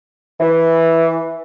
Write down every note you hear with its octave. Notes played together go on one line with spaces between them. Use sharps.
E3